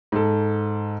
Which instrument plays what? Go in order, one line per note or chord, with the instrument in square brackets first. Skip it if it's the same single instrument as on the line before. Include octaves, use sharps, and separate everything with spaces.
[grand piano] G#2 A4